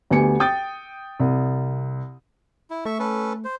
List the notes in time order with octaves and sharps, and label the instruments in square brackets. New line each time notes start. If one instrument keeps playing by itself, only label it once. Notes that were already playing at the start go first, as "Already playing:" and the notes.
[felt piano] D2 B3 G4 G#5 C#7
G5 D#6 G6 A6
C2
[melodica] E4
[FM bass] A3 [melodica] E5 C#6
[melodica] C#4 A4 B4
C5